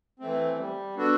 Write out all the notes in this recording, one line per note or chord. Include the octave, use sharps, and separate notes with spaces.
E3 A3 C4
G3
B3 D4 F#4 A4